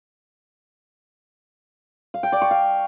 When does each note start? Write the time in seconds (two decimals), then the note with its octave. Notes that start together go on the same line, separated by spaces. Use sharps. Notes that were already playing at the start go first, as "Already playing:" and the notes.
2.14 F5
2.23 G5
2.32 D5
2.42 C#6
2.51 F5